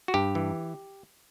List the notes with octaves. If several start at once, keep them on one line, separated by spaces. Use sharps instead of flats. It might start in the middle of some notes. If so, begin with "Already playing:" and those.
F#4
G2 G4
E3